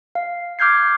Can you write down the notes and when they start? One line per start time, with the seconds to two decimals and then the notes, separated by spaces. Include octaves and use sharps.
0.15 F5
0.59 D6 F6 G6 G#6 C7